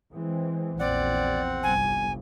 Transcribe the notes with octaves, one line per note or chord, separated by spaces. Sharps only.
E3 G#3 C4
A#1 E2 C4 D5 F#5
G1 C2 G2 G#5